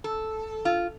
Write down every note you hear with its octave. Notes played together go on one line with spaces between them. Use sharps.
A4
F4